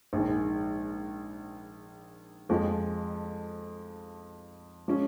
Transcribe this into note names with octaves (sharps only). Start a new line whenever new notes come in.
A#1 G#2 D#3 G#3
F2 F3 G#3
F3 G#3 C#4